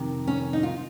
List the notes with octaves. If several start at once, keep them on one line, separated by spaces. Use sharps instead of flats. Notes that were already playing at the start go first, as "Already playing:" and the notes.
Already playing: F2 C3 D#3
C#4
D#4
F4